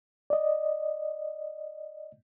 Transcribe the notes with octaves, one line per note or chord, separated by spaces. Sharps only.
D5 D#5